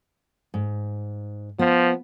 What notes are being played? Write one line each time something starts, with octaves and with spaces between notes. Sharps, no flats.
G#2
F3 B3